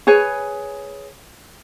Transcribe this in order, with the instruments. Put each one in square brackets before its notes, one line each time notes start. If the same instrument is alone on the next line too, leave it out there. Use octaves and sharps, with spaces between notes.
[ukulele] G#4 B4 C#5 G#5